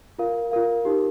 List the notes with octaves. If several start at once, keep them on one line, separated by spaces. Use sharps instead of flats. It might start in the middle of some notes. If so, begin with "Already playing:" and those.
F4 A#4 F5
F4 A#4 F5
D#4 G4 A#4